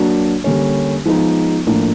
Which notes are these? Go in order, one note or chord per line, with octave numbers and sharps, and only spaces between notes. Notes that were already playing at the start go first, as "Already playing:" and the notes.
Already playing: F#3 A#3 D4
D3 G3 A#3 C#4
F3 G#3 B3 D#4
A2 F3 A#3 D4